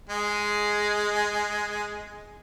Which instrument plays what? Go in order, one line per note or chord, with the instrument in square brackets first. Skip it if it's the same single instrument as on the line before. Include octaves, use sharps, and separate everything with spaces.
[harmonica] G#3 G#4